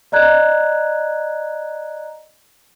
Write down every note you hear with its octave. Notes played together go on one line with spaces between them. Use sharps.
D5 D#5 A#5 F#6 G#6